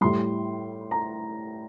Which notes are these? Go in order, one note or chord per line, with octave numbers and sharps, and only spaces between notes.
A2 G3 C6
A#5